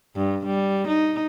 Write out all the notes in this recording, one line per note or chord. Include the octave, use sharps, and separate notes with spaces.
G2
G3
D#4